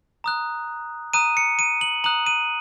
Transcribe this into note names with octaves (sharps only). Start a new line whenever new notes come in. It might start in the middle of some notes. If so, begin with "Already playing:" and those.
A#5 D#6 F#6
A#5 D#6 F#6 D#7
C#7
D#7
F#7
A#5 D#6 F#6 F#7
D#7